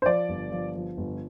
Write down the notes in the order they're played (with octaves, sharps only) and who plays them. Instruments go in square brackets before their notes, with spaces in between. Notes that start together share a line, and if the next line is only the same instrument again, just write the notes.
[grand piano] C5
F3 D5
G1
F3
F3
G1